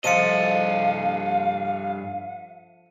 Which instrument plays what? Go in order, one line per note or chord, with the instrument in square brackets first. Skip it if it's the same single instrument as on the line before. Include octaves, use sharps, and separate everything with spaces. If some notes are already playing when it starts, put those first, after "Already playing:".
[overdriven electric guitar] G2 D#5 [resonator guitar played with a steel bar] F3 A4 C5 [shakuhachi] F5 [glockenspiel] C#7 D#7